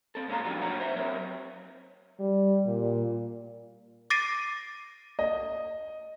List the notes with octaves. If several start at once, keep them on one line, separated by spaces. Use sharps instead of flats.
C4 A4
A#2 G#3 C#4 E4 F5 A#5
F3 F#3 D4 D#4 F#4 G4
A#2 B3 D4 C#5 F#5 A#5
C5 E5
F#3 C4 A#4 C#5
G3
A#2
D6 A6 A#6 C7 D7 D#7
D#5